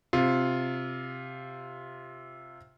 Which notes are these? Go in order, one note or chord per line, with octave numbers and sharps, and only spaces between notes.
C3 F4